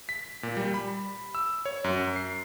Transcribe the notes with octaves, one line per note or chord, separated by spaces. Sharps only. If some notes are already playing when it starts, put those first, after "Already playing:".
B6
A#2
G3
B5
E6
C#5
F#2
C7